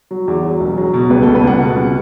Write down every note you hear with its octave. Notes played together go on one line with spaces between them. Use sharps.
F#3
E2
F#3
E1
F#3
B2
C#2 B4
C#2 A4
B4
C#2 F#5
B2
C#2